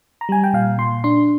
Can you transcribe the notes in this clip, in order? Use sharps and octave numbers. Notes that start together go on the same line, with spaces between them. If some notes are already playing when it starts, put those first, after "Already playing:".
A#5
G3 G#5
G5
A#2 F5
A#2 C6
D4 C6